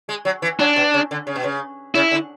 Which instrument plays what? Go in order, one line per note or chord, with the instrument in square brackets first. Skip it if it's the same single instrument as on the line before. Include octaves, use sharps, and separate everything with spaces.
[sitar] G#3
F#3
E3
[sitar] F#3 [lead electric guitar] D4
[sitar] B2
C#3
D3
C#3
B2
C#3
[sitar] C#3 [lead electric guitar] E4
[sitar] D3